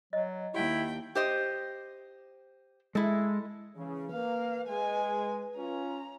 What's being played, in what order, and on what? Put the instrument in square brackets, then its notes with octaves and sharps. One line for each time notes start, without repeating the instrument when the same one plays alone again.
[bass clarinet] F#3 [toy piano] D#5
[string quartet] D#2 G5 [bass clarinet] E4 [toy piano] G4 F#5 A5
[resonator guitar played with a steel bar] G4 C5 D#5
[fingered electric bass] G#3 [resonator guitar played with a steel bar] E4 A4
[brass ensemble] C#3 [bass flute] E3
[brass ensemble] A#3 [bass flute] B4 [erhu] F5
[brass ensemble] G#3 [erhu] G#5
[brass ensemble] C#4 F4 [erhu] A#5